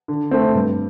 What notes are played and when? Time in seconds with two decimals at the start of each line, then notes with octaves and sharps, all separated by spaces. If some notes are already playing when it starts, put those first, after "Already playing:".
0.08 D3
0.31 A3 C4
0.54 G2